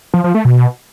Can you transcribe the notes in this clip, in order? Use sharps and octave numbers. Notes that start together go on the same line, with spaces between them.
F3
F3
A3
B2